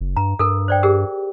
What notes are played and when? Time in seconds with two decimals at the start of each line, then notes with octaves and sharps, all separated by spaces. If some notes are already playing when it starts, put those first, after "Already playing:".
0.01 F#1
0.17 G2 A#5
0.39 G2 A4 A#4
0.68 C5 D5 G5
0.83 G4 G#4 A#4